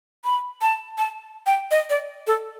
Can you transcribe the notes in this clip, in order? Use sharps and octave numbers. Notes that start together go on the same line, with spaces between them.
B5
A5
A5
G5
D#5
D5
A4